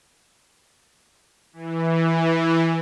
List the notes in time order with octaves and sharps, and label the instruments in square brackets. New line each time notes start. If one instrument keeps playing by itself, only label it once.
[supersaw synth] E3